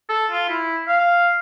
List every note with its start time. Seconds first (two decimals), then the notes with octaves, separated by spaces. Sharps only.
0.09 A4
0.31 F4
0.49 E4
0.88 F5